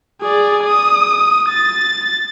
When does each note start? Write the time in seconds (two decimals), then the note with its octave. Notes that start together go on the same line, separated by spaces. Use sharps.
0.22 G#4 D5
0.64 D#6
1.49 A6